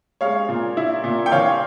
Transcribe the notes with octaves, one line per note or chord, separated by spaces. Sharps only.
G#3 C#5 F5
A#2
E4
A#2
G5
E3 C#5 F5